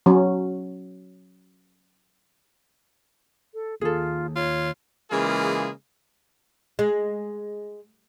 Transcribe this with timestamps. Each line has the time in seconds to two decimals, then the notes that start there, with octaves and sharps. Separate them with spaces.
0.06 F#3 C#4
3.54 A4
3.81 D#3 A#3 F4 G#4 A4
4.36 F4 C#5
5.10 C#3 E3 G#3 A#3 F4 G#4
6.79 G#3